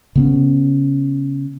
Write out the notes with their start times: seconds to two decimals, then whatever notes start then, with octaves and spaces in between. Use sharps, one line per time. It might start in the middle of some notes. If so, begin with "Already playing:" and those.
0.15 C#3 B3 C#4